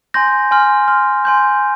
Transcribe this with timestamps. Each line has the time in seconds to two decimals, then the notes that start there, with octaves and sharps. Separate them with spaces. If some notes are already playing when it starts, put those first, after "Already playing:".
0.14 G#5 C6 G6 A#6
0.51 G#5 C6 F6
0.88 C6 F6
1.25 G#5 C6 G6